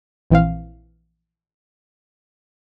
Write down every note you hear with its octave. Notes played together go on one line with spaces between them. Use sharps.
A#1 E3 C4 F5